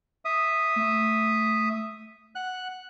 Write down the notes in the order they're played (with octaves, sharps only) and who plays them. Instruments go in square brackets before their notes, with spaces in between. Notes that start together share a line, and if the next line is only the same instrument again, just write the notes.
[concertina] E5 D#6
[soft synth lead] A3
[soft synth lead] F#5 [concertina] F#6